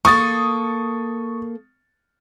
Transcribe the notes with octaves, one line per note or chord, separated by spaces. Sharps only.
A#3 A4 C#6 D#6 A6